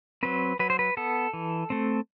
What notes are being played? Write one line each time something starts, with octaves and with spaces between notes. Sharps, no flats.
F#3 C4 B4
F#3 B4
C5
B4
B3 A4
E3
A3 C4